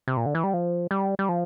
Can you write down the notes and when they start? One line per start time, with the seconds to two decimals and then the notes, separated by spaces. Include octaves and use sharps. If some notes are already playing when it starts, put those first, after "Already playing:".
0.08 C3
0.17 A#2
0.26 D3
0.35 E3
0.44 G3
0.54 F3
0.91 G3
1.19 G3
1.29 F3